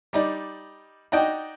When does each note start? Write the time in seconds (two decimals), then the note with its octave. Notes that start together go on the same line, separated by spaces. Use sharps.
0.13 G3 D#4 D5
1.12 D#4 F#4 D5 D#5 G5